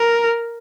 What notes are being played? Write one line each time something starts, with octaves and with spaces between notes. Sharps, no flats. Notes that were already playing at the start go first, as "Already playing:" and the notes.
Already playing: A#4